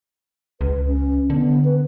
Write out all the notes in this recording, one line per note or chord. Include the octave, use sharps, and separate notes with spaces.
C#2 B4
C#4
D3 B3
B4